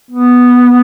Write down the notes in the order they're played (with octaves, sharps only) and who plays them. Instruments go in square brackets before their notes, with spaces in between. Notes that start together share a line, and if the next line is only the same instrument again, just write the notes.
[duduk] B3